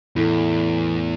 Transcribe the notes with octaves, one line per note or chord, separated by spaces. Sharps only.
E2 A2 A3 E4